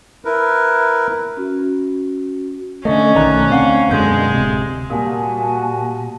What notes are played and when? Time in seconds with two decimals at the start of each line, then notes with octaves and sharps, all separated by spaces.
0.25 E4 A#4 B4
1.37 C#4 F#4
2.85 D3 A3 C#4 D#5
3.15 B1 D#3 A3 D5 A#5 F#6
3.50 D2 C4 F5 F#5
3.91 F#2 B2 D3 G#3 G6
4.33 D1 C3
4.90 A#2 G3 A#3 F#4 G#5 A5 D#6